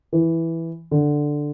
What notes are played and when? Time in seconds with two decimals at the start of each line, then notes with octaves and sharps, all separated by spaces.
0.13 E3
0.91 D3